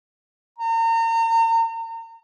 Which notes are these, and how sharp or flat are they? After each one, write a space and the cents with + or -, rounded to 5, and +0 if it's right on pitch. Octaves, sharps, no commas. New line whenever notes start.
A#5 -35